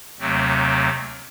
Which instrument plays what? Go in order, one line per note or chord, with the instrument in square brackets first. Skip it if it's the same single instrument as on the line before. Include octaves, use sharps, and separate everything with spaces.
[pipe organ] D#2 C3 F#3 A3 C4